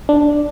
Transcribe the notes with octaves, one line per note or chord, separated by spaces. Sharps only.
D4